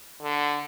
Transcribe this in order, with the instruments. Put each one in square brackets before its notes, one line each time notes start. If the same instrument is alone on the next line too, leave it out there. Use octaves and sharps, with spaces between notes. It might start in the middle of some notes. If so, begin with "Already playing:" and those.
[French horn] D3